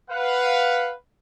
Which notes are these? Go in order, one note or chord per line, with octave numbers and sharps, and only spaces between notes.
B4 F5 F#5